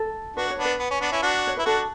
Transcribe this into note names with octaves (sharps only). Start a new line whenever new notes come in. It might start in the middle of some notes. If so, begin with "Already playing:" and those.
Already playing: A4
D4 F#4 B4
C#5
B3 D4
B4
B3
C#4
B3 D4
C#4 E4
D4 F#4
C#5
E4 B4
D4 F#4 A4